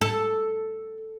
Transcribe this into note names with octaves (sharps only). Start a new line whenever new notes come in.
A4